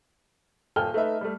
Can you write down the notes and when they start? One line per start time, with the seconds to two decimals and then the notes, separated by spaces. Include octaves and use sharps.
0.76 D#1 A4 G5 G#5 F6 G7
0.94 A3 D#4 B4 E5
1.21 G3 A3